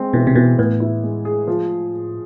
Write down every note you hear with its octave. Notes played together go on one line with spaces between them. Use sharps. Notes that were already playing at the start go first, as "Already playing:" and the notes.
Already playing: G#3 C4
B2 E3
C3
B2 E3
A2 B3
E4
G#3
G#4
F3